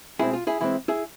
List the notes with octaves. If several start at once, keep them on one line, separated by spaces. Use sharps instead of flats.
B2 G#3 C4 E4 G#4
F4
E4 G#4
E3 G#3 C4 E4
E4 G#4